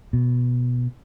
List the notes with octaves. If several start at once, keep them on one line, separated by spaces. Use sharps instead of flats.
B2